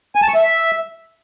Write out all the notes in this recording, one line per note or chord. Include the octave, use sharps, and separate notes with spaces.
G#5
A5
C#6
E5